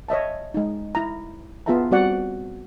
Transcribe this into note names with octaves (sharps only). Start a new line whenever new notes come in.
C#5 D#5 E5 A5
G#3 D#4
E4 A#5
B3 F4 G#4 E5 A5 A#5
G3 C4 F#4 D5 F#5